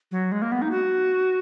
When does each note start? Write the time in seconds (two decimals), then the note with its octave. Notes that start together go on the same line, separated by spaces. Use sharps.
0.12 F#3
0.32 G#3
0.42 A#3
0.52 B3
0.62 D#4
0.71 F#4